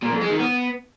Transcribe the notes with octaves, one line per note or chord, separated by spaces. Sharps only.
A#2
F2
G#3
D#3
B3